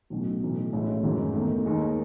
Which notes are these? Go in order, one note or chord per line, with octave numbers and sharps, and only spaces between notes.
B1 A2 F#3 C#4
B1 A2 E3
A1 A2 G#3 C#4 E4
G#1 F#2 C#3 E3 G#3
E2 D#3 A3
D#2 D#3 G#3 D#4